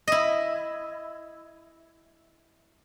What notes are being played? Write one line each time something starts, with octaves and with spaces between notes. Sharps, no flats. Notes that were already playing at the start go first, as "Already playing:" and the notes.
E4 D#5